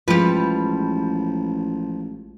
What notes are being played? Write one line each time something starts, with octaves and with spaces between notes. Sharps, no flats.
A1 F3 G3 G#3 F4 B4